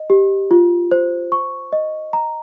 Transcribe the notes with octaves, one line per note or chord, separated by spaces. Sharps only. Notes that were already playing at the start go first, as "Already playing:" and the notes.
Already playing: D#5
G4
F4
C5
C#6
D#5
A#5